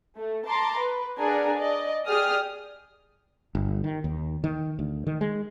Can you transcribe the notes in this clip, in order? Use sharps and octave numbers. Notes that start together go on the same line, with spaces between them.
A3
A5 A#5 C6 D6
B4
D4 G#4 A#4 F#5 G#5 A#5
D5 D#5
G4 G#4 D5 D#6 F6
G1
D#3
D#2
D#3
D2
D#3
G#3